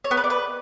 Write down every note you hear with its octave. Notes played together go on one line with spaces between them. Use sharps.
C#5
B3
B4
D5
B4